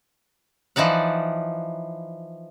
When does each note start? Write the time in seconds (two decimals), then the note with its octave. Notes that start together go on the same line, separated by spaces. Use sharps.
0.76 E3 F3 D#4 D5 F#5